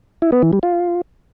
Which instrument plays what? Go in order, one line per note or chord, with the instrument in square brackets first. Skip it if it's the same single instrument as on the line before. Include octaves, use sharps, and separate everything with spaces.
[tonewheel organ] E4
B3
E3
G3
F4